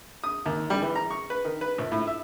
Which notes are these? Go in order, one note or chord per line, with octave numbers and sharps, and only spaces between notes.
D#6
D#2
G3
E3
A#5
C#6
B4
D#3
B4
A#1
A2
E5